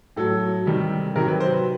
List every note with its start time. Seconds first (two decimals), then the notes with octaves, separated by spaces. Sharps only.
0.16 A2 F#3 A4
0.66 C3 D#3 G3
1.16 C3 D#3 F#3 A#4
1.28 B4
1.40 C5
1.52 B4